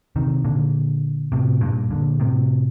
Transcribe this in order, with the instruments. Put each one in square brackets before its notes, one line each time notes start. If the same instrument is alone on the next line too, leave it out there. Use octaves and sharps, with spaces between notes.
[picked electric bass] C3 D#3
A#2 D3
A2 C3
G2 A#2
A#2 D3
A2 C3